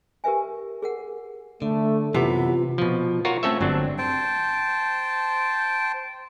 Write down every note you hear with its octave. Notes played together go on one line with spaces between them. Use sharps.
G4 A#4 B4 E5 G#5
G#4 A#4 F#5
D3 A3
F#2 C3 E3 B3 F4
B2 F3
F4 F#4 A#4 C#5
A3 C4 C#4 A4 C#5 E5
G1 F#3 C4 D4
C5 G5 A5